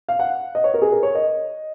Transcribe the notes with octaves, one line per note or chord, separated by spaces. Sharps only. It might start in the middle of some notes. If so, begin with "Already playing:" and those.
F5
F#5
D#5
C#5
A#4
G#4
A#4
C#5
D#5